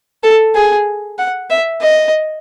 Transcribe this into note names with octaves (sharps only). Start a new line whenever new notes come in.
A4
G#4
F#5
E5
D#5